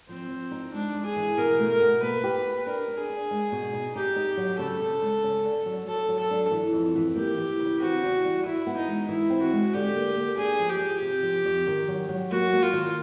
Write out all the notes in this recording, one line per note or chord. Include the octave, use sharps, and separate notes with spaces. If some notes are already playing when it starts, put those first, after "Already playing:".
F3 C4
F3
D#4
G#3 D4
G#3
G#4
E3
B2 A#4
A3
A#4
B2
A#3 B4
G4
G4
D4 A#4
D4
G#4
D4
G#3
B2
D#4
D#4 G4
D#4
F#3
C#3 A4
C#3
G#3
C#4
D3
F#3
F#3 A4
F#3
A4
D4
E3
F2
E3
A#3 G4
E3
C#3
C4 F#4
E2
G3
E3 E4
B3
D#4
G#3
E3 E4
C4
F#4
G#3
D3 G4
A#3
A#3
D4 G#4
F3
G4
F3
C3
F3
F2
D#3
F#3
F#3
A#3 F#4
A#3
F4
D#3